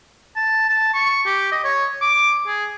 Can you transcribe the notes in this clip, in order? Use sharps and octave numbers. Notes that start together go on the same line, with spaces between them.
A5
A5
C#6
G4
D#5
C#5
D6
G#4